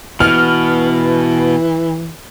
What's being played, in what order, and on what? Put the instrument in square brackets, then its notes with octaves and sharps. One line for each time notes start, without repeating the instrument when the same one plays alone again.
[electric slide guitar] B2 [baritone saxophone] E3 [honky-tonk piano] F6